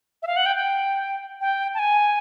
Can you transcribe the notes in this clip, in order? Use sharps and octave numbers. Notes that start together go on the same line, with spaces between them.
E5
F5
F#5
G5
G5
G5
A5
G#5